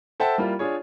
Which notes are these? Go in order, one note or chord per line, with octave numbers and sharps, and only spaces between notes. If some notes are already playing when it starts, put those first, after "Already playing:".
A4 C5 E5 F#5 G5 A5
G3 A#3 E4 F4
D4 F4 G#4 C#5